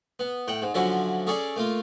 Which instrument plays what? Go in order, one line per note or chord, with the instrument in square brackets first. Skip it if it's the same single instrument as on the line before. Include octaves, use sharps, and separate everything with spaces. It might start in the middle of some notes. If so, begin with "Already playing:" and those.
[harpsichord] B3
A2 F#5 G5
G#2
D3 F3 F#3 C#4 E4 F#4
C#4 G#4 A4 C#5 D5
A3 A#3 F4